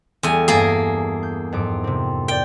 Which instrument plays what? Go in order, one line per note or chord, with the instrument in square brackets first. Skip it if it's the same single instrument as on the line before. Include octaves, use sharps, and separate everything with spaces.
[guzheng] E2 G#5 [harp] G3 A3
[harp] G2 A5 D#6 [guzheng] A#3 G#4
[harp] G6
F2 G#2 D6
C3 C4
[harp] A#4 D5 [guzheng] G5